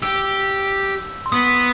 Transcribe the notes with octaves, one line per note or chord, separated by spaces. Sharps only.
G4 E6
C6
B3 D#6